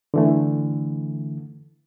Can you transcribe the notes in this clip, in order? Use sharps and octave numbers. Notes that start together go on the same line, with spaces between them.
D3 E3 A3